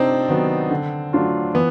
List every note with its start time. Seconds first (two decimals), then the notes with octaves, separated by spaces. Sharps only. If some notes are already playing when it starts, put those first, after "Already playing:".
Already playing: C3 C4 D4 D#4
0.29 D#3 F#3 B3
0.70 D3
1.13 F#3 A3 D4 F4
1.55 E3 B3